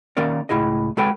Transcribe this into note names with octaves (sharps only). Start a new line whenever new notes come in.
D#3 A#3 C#4 A#4 D5
C#2 A2 E4 G#4 D#5
G#3 F#4 A4 B4 C#5 G5